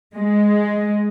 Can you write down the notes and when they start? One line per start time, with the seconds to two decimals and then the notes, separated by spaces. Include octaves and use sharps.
0.16 G#3